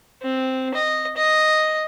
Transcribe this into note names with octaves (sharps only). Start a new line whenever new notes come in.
C4
D#5
D#5